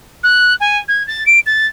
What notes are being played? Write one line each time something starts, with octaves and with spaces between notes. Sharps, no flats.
F#6
G#5
G#6
A6
D7
A6